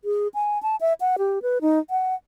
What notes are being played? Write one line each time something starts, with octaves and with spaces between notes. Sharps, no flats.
G#4
G#5
A5
E5
F#5
G4
B4
D#4
F#5